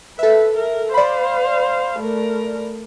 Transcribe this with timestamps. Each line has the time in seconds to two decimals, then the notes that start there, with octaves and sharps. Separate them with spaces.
0.19 A4 B4 E5
0.57 A#4
0.94 C5 D5 F5 B5
1.99 A3 A#4